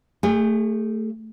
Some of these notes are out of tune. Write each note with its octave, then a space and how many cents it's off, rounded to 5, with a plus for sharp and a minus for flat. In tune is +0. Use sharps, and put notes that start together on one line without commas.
A3 +15 G#4 -35